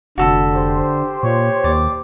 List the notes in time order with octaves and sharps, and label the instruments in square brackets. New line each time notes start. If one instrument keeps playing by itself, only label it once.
[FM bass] F1 [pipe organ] D3 [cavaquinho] F#4 A4 B5
[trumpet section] G4 C5
[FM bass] A#2 [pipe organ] C#5
[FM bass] D#2 [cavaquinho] D5